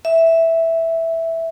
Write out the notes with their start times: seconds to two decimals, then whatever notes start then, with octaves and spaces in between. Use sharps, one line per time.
0.05 E5